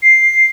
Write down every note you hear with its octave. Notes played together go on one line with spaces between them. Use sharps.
C7